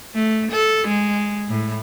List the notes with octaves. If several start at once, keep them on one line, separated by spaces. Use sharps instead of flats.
A3
A4
G#3
A2